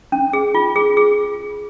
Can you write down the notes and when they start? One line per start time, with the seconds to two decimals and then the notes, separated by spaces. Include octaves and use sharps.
0.12 C#4
0.33 G#4
0.55 F4
0.76 G#4
0.97 G#4